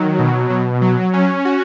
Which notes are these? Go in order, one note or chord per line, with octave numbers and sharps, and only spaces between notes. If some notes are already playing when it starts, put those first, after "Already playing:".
Already playing: D#3 F#3
B2
B2
F#3
C#4
F#4